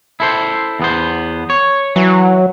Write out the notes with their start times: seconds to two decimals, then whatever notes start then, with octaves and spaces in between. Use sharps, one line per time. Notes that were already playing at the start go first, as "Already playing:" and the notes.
0.20 E4 A4 C5
0.80 E2 B3 C5
1.50 C#5
1.96 E3 F#3